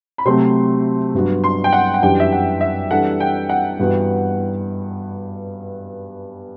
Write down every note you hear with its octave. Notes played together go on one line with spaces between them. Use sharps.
B5
C3 F#3 A3 C4 F#4 C6
G2 F#3 B3 D4 F#4
C6
G5
F#5
F#5
F#2 E3 G3 D4 G4 G5
E5
F#5
E5
E3 G3 D4 A4 F#5
G5
F#5
G2 E3 B3 F#4